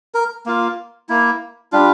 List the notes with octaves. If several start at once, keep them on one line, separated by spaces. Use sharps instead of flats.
A#4
A#3 F4
A#3 E4
G3 D4 F4